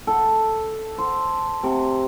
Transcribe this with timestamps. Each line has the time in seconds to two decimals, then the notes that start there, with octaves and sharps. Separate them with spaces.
0.07 A4
0.98 C5
1.63 C3